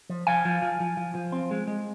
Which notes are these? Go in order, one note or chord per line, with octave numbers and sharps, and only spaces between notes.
F3
F3 F5 G#5
F3
F3
F3
F3
F3
C4
G#3
G#3